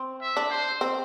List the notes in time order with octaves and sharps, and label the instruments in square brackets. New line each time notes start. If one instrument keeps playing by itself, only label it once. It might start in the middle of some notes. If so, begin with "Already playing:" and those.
Already playing: [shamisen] C4
[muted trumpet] E5
[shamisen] D4
[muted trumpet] C5
[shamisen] C4